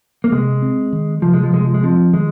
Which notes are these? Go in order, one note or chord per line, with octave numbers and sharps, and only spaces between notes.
A#3
C3 G#3
C4
D#3
C3 F3
G#3
F3
C3 G#3
F3
G#3
F3 C4
D#3 G#3